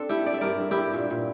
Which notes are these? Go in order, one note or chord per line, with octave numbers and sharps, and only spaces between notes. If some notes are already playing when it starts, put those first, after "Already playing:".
Already playing: C4 D4 A4
A3 E4 G4
A3 D5
E5
G2 A#4 D5
G2
E4 G4
G2
A#2
A#2